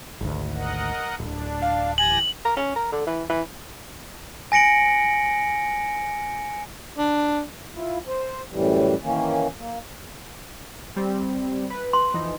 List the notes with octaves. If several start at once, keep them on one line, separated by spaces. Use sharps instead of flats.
G#1 D2
A#4 D#5 F#5
D1 D4
F5
E3 G4 G#5 A#6 F#7
A#4
C#4
A#4
D3
E3
E3
G#5 A#6 C#7 D7 F#7
D4
E4 F4
C5
F#2 A2 E3 G3
D#3 E3 A#3 C#4
A#3
G3 C4
B4
C6
F2 E3 D#4